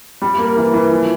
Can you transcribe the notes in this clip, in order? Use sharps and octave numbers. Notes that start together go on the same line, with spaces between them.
G3
A#3
E3
E3
F3